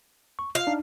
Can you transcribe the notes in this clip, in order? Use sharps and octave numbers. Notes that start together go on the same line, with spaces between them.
C#6
F4 F5
D4 D#4